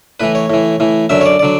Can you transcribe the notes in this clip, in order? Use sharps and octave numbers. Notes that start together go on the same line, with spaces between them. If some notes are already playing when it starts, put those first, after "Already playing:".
A2 E3 B4
C#5
A2 E3
A2 E3
F#2 D3 F#3 E5
C#5
D5
D3 F#3 D5